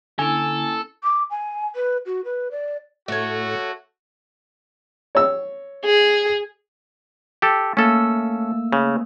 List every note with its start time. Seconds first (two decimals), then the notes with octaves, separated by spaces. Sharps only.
0.19 D3 A#3 C#4 E4 A4 G#5
1.03 D6
1.30 G#5
1.76 B4
2.06 F#4
2.25 B4
2.51 D5
3.08 A2 A3 F#4 C#5
5.15 C#5 E6
5.85 G#4
7.42 G4 A4
7.77 A3 A#3 C#4 A4 E6
8.73 C#3